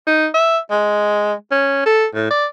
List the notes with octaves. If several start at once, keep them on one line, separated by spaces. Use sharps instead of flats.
D#4
E5
G#3
C#4
A4
A2
D5